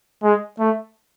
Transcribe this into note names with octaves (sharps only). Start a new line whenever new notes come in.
G#3
A3